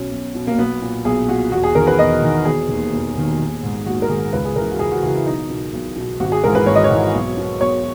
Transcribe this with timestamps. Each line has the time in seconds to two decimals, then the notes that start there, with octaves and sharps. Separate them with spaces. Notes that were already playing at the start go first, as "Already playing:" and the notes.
Already playing: B1 B2 C#4
0.11 B1
0.35 B2
0.47 A#3
0.58 B1 B3
0.82 A#2
1.05 B1 G#4
1.29 A#2 F#4
1.52 E1 F#4
1.64 G#4
1.75 E2 D#3 A#4
1.87 B4
1.99 E1 D#5
2.22 E2 D#3
2.45 E1 G#4
2.69 D#2 D#3
2.93 E1
3.16 D#2 D#3
3.39 A#1
3.63 G#2 D#3
3.86 A#1 F#4
4.02 A#4
4.09 G#2 D#3 G#4
4.33 C#2 B4
4.45 G#4
4.56 C#3 E3 A#4
4.71 F#4
4.79 C#2 G#4
4.91 F#4
5.03 C#3 E3 F#4
5.15 E4
5.26 B1 D#4
5.50 B2
5.73 B1
5.96 B2
6.20 G#1 F#4
6.32 G#4
6.44 G#2 E3 A#4
6.55 B4
6.66 G#1 C#5
6.75 D#5
6.84 C#5
6.90 G#2 E3
7.14 B1
7.37 B2
7.60 B1 C#5